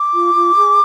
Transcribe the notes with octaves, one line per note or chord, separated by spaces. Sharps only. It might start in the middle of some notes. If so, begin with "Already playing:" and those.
Already playing: D6
F4
F4
G#4